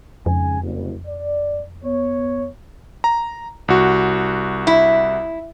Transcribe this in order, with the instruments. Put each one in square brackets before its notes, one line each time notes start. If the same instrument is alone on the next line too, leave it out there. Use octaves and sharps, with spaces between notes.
[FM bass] F2 [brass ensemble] G#2 C#3 G#5
[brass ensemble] F#1 C2
D5
B3 C#5
[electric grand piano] A#5
C2 F#4
[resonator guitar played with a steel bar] E4